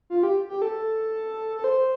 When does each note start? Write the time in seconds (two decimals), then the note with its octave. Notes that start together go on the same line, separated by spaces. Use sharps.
0.10 F4
0.23 G4
0.49 G4
0.62 A4
1.57 A4
1.64 C5